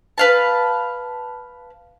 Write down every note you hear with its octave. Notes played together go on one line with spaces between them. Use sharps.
B4 F5 A5